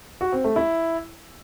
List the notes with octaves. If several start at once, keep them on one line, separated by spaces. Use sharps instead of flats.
F#4
C4
A3
E4